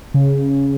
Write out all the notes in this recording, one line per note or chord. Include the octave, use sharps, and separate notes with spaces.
C#3